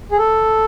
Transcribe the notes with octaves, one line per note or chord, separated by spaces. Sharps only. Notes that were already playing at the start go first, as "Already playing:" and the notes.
G#4
A4